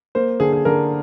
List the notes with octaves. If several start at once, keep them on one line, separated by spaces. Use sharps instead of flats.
A#3 C5
D3 G#4
G#4
D3 A#4